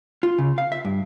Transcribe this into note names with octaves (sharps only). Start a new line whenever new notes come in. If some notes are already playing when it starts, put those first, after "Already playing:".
F4
C#3
F5
E5
G2